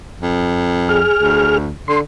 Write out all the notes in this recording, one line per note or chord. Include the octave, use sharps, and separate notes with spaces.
F2
G#4 F6
D2
D3 C6